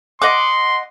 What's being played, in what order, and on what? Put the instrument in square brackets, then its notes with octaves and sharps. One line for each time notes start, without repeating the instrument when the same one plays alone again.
[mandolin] D#5 F#5 D6 [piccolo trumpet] C6